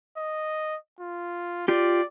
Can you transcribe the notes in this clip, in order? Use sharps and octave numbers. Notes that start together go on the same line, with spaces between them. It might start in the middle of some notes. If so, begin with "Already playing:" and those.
D#5
F4
F4 G4 D5